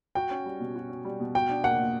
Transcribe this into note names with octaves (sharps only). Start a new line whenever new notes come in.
F#4 G5
C#4
G3
B2
F#4
C#4
G3
B2
F#4 G5
D4
A#3 F#5
A#2